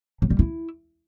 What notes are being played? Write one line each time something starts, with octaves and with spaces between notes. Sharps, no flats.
F#3
G3
E4